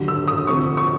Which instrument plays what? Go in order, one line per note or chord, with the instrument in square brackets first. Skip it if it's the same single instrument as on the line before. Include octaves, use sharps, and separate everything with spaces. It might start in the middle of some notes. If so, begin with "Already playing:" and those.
Already playing: [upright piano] D#2 D3 F#3
E6
D#6
D2 C3 F3 C#6
C#6